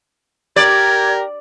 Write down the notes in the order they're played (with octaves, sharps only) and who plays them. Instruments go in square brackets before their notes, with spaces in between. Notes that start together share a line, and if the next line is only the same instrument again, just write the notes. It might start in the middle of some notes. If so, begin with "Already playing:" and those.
[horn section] G4 A#4 [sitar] D5 [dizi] G#6